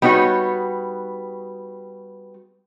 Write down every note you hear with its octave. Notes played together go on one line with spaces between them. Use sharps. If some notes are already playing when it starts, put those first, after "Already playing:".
G3 B3 D#4 F#4 C#5